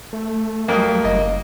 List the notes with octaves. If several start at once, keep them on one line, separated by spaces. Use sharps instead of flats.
A3
F2 F#3 G3 A3 A#3 D#6
F#1 D#5